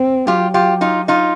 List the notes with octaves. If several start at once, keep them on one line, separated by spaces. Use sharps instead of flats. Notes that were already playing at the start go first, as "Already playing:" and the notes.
Already playing: C4
F#3 F4 G4
F4 G4
D#4 F4
D#4 F4